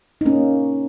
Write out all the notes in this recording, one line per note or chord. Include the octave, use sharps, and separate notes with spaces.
D#4
A#3 C#4